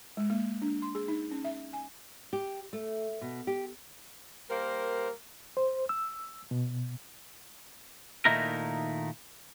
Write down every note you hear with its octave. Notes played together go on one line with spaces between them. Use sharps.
G#3
A#3
D4
C6
G#4
D#4
C#4
E5
G#5
G4
A3
B2
G4
G3 A#3 A#4 C5
C5
E6
B2
A#2 D#3 A3 D#4 E4 A#4